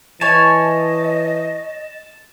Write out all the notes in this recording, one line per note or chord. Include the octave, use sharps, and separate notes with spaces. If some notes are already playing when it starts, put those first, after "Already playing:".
E3 C#5 D#5 G#5 A5